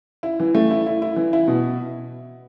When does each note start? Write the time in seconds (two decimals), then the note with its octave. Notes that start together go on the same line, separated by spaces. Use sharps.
0.23 E4
0.40 E3
0.55 A3
0.71 E4
0.86 E4
1.02 E4
1.16 E3
1.33 E4
1.47 B2